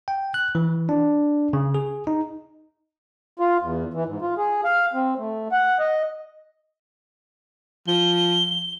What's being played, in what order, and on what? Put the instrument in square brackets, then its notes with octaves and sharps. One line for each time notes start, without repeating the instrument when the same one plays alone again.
[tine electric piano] G5
F#6
E3
D4
C#3
G#4
D#4
[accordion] F4
E2
E3
G#2
F4
G#4
F5
C4
A3
F#5
D#5
[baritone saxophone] F3 [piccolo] G7